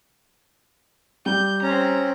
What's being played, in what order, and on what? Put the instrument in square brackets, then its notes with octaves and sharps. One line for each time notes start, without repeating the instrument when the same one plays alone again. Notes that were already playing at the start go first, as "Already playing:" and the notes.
[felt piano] G3 [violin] G6
[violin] C4 A#5 [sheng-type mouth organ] C#4